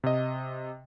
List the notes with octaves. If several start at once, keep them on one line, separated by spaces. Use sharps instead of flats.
C3 D#5